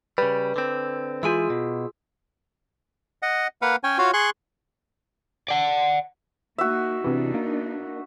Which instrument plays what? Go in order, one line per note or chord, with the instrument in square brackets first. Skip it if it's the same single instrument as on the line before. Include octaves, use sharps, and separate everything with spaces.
[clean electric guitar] C#3 G3 [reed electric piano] B4
[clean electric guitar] D3 C4
[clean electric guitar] E3 G#3 G#5 [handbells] F4 G#4 E6
[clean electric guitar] B2
[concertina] D#5 F#5
A#3 B4 F5 F#5
C#4 C#5 G5 G#5
F4 F#4 C#5 F5
G#4 C6 C#6 F#6
[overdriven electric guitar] D5 F#5
[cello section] A#3 D#4 [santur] F#4 E5
[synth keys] C3 E3 [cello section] B3 D4 D#4
[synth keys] A#3